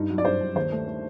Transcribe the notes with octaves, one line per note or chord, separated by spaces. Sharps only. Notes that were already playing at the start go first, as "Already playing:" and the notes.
Already playing: G2 D#4
F#3
D5
G2 C5
G2
D#2 C5
A3
A3